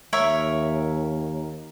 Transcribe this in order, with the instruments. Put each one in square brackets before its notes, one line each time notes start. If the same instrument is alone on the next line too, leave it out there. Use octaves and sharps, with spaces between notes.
[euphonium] D#2 [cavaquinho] A#4 C#5 E5